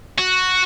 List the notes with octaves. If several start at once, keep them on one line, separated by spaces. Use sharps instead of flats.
F#4